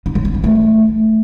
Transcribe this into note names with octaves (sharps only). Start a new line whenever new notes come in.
D#4
F#3
B3
E3
A3